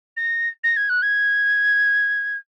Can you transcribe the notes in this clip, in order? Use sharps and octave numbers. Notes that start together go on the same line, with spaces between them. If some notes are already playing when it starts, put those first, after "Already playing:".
A#6
A#6
G#6
F#6
G#6